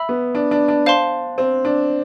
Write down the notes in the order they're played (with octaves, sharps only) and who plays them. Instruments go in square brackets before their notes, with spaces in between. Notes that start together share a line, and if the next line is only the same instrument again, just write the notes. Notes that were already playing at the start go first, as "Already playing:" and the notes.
Already playing: [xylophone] E5 B5 E6
[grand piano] B3
D4
D4
D4
[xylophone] C5 F5 A5 C6
[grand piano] C4
D4